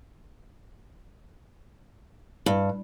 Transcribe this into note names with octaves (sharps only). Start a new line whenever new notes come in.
G2